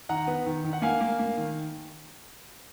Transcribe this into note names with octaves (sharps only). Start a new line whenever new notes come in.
D#3 F#5 A#5
B3
D#3
D#3
F#5
A#3 F5 G#5
A#3
A#3
D#3